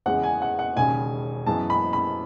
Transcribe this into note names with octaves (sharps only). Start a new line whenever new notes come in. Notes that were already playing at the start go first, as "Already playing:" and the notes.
E2 C#3 G#3 B3 F#5
G#5
F#5
F#5
E1 D#2 C#3 G#5
F#2 E3 G#3 B3 A5
B5
B5